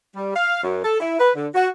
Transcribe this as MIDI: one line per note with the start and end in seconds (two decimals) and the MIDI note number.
0.15 0.32 55
0.35 0.62 77
0.63 0.82 42
0.84 0.97 69
0.99 1.16 64
1.19 1.30 71
1.35 1.47 50
1.55 1.67 66